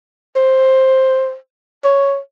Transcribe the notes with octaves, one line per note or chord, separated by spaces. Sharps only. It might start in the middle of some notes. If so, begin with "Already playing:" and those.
C5
C#5